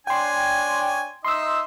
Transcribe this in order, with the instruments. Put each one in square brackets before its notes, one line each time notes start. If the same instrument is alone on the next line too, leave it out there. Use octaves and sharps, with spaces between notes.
[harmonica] D4 C#5 G#5 [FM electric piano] G5 C6
[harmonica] D#4 D#5 E5 [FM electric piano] C6 E6